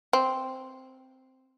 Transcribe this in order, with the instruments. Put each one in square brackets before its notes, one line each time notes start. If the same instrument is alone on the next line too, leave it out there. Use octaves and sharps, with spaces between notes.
[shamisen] C4